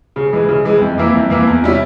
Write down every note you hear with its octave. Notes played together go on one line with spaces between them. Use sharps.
C#3
E3 G#3
C#3
E3 G#3
F2
E3 A#3 E4
F2
E3 A#3 E4
E2
C3 G3 C#4 E4